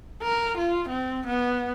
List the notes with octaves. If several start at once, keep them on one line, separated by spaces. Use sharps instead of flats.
A#4
F4
C4
B3